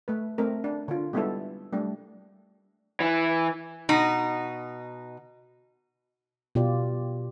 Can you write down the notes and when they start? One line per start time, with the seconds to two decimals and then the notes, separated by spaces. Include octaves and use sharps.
0.08 A3 B4
0.38 A3 C4 A#4
0.64 D4
0.88 D3 F4
1.13 G3 G#3 B3 D4 E4 A4
1.73 G3 A3 D4
3.00 E3
3.89 B2 D#4
6.55 B2 F4 G4 D5